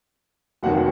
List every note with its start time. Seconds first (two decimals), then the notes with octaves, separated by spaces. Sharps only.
0.63 F1 D#2 D#3 F#3 F#4 F#5